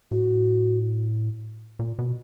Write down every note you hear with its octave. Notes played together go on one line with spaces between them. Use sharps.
A2 F#4
A#2
B2